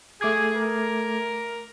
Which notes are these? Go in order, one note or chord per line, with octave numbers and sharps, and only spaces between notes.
A3 G#4 D6 G#6
A#4